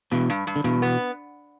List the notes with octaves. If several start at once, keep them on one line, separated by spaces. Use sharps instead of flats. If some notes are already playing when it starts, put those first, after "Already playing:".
G2 B2 E3
G2
G2
D3
G2 B2 E3
B3